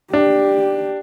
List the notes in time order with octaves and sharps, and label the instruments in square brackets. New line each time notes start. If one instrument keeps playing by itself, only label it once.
[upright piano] D4 [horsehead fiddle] G4